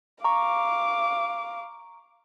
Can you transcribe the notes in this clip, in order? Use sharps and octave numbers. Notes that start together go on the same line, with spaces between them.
F5 A#5 C#6 D6